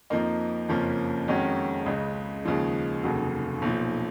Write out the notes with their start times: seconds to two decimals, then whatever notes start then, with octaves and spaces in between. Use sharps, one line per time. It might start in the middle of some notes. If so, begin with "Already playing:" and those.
0.10 F2 F3 A#3 D#4
0.69 F#1 F2 F3 A#3 C#4
1.28 F2 D#3 G#3 C#4 F#4
1.86 C#2 C#3 G#3
2.45 D#2 C#3 F3 G#3
3.03 F1 D#2 C#3 F#3
3.62 B1 A#2 F3